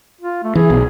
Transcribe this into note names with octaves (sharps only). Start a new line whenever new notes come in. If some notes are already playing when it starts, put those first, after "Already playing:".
F4
A3
E3 G#4
B1